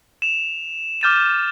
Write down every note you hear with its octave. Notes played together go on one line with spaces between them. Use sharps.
E7 F7
D6 F6 G6 A6 D#7 E7